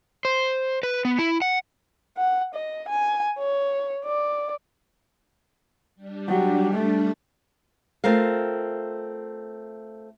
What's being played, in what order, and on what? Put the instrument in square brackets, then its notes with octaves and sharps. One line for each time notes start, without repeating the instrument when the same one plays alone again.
[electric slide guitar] C5
B4
B3
E4
F#5
[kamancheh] F#5
D#5
G#5
C#5
D5
[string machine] G3 D4
[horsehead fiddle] F#3 G4
A3
[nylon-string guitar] A3 C4 F4 A#4 F5